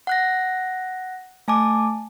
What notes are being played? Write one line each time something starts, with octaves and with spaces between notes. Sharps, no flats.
F#5 F#6 A#6
A3 G#5 A5 D6